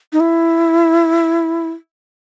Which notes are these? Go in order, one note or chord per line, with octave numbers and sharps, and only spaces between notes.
D#4
E4